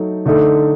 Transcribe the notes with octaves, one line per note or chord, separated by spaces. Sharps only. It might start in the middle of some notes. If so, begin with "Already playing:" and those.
Already playing: F#3 A3 D#4
D3 A3 D#4